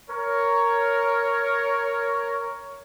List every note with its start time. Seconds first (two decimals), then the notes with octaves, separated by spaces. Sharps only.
0.10 A#4 C#5